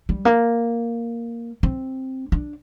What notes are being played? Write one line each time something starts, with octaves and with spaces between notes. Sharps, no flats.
G3
A#3
C4
D4